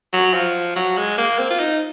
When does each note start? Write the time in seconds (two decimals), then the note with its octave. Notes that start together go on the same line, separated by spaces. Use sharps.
0.13 F#3
0.34 F3
0.76 F#3
0.97 G#3
1.18 A#3
1.39 C4
1.50 F4
1.59 D#4